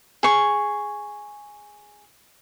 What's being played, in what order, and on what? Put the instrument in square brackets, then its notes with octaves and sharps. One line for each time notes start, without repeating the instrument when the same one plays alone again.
[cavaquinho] G#4 C#6